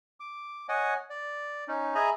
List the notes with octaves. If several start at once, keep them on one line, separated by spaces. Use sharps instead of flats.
D6
C#5 D#5 F#5 G#5
D5
C#4 D#4
G#4 D#5 E5 G#5 A#5 B5